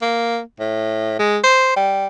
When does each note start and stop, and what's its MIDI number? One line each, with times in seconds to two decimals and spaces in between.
0.02 0.40 58
0.60 1.14 45
1.19 1.38 56
1.43 1.72 72
1.76 2.07 55